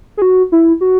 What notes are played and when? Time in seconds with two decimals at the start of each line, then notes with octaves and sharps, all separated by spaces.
0.17 G#4
0.22 F#4
0.52 E4
0.81 F#4